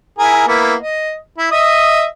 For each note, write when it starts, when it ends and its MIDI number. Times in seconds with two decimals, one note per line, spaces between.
0.19 0.46 64
0.19 0.46 68
0.19 0.46 70
0.48 0.74 58
0.48 0.74 59
0.48 0.74 64
0.81 1.15 75
1.38 1.50 64
1.52 2.05 75
1.52 2.05 76
1.52 2.05 87